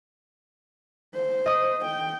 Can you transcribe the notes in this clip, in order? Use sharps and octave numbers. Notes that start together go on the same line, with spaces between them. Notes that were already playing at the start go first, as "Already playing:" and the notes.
C5
D#5 D#6
G5